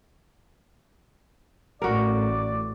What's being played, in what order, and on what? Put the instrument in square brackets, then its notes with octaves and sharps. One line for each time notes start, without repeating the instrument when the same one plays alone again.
[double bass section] A1 [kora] F#4 A#4 [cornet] D5